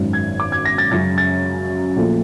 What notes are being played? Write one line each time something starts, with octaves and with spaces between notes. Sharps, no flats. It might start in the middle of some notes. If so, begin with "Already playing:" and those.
Already playing: G#1 F#2 D#3
G#6
D6
G#6
A#6
A6
F#2 C#3 F#3 A6
A6
A#1 A#2 F3 A3